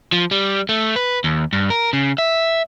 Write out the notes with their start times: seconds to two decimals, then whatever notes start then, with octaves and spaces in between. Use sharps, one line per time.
0.12 F3
0.31 G3
0.69 A3
0.96 B4
1.24 D#2
1.53 G2
1.70 A#4
1.93 C#3
2.18 E5